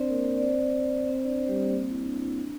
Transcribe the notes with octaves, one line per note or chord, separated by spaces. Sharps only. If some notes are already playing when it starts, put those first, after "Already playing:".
Already playing: C4 D4 C5 D5
A#3 A#4
D5
C4 C5
C4 C5
D4 D5
C4 C5
G3 G4
C4
A#3
C4
E4
D4
E4
D4